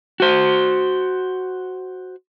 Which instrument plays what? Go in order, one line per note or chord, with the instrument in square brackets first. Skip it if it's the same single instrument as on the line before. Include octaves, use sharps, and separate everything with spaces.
[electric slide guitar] F#4 C5